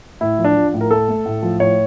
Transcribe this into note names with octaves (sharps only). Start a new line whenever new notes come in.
A2 E4
F3
D4
F3
A2
A#4
A3 A4
A3
A2
F3
A2 C#5